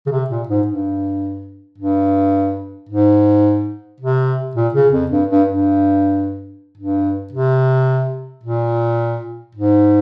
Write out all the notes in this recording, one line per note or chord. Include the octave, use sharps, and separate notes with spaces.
C#3
C3
A#2
G#2
G2
G2
G#2
C3
A#2
C#3
F2
G2
G2
G2
G2
C3
A#2
G#2